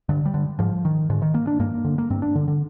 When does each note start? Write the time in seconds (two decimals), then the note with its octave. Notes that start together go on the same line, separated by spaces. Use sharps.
0.09 G2 D3
0.25 G3
0.34 D3
0.59 G#2 F3
0.85 D#3
1.10 G#2 D3
1.22 D#3
1.34 A#3
1.47 D4
1.59 G2 A#3
1.84 D3
1.98 A#3
2.10 G2 C4
2.22 D4
2.35 D3
2.48 D3